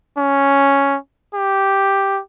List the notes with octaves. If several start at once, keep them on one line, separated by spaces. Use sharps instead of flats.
C#4
G4